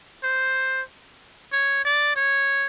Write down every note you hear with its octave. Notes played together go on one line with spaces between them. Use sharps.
C5
C#5
D5
C#5